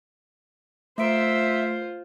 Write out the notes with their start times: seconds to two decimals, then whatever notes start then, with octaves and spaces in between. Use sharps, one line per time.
0.98 A3 F4 C5 E5 D7